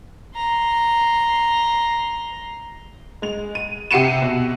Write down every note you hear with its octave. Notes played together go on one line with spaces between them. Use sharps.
A#5 C6
G#3 F7
D#7
C3 G4 C7 C#7 D#7 E7
B2